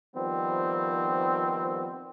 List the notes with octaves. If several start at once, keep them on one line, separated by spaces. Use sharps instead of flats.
D#3 F3 G3 B3 C4